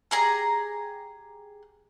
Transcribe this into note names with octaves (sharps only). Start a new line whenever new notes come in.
G4 G#4 A#5